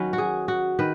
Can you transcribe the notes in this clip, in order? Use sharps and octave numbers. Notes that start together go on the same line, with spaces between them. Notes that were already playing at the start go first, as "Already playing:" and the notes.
Already playing: D#3 F#3 C#4 B4
F#4
G#4
F#4
D#3 B4